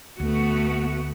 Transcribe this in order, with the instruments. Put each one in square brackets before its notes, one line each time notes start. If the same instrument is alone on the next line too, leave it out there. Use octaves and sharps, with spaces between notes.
[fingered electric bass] D2 [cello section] A3 B3 F#4